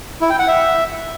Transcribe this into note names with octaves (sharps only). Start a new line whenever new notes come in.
E4
G5
F#5
E5